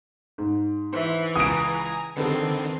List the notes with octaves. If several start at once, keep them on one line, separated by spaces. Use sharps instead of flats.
G#2
E3 C5 E5
C#2 G#5 A#5 D#6 D7
D3 D#3 C4 A4 B4